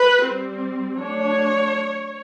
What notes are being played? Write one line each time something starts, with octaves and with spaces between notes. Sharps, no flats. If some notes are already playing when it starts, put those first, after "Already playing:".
Already playing: B4
G3 C4
F#3 A3 D4 C#5